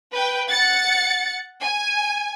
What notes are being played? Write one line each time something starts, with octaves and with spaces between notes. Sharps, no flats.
B4 G5
F#5 A6 C#7
G#5